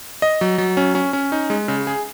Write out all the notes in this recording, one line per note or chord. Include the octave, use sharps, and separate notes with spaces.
D#5
F#3
F#3
C#4
C#4
C#4
D#4
G#3
C#3
G#4